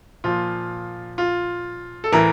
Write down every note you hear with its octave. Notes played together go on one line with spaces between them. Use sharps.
A#2 F3 F4
F4
A4
A2 E3 A#4